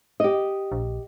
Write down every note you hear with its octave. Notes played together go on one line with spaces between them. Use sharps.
G4 D#5
A#1